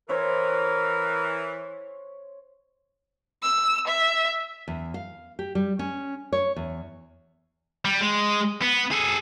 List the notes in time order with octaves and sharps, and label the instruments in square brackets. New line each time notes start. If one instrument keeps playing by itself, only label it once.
[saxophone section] E3 [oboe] A#4 [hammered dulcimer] C5 C#5
[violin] E6
E5
[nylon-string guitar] E2
F5
G4
G3
C#4
C#5
E2
[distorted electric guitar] G3
G#3
B3
G#4 A4